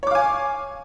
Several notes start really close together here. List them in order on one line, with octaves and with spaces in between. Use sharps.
C#5 D6 F5 G#5